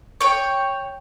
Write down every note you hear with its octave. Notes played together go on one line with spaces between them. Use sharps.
C#5 G5